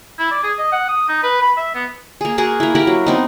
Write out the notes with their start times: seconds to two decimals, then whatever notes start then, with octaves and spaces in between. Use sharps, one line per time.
0.19 E4
0.31 D5
0.43 G#4
0.59 D#5
0.72 F#5
0.89 D#6
1.08 D#4
1.23 B4
1.42 B5
1.57 E5
1.75 B3
2.21 A#3 G#4
2.38 F#4 G#4 A#4 F#5
2.60 A#3 E4
2.75 E4 G4 A#4 F#5
2.87 F#3
3.06 B3 C4 D#4